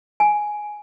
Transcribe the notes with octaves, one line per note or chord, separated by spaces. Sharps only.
G#5